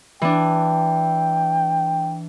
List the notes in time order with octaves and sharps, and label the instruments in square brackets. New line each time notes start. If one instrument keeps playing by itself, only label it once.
[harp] E3 D4 [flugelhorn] G5